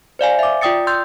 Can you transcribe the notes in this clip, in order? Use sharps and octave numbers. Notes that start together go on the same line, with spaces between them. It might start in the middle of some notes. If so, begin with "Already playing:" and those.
C5 D5 F5 G#5
E5 D6
F4 D5 G5 D#6 A6 C#7
C6 E6 G6 A6